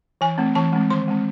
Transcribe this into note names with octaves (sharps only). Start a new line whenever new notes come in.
E3 G#5
A3 C4
E3 A5
G#3 C4
D#3 C6
G#3 C4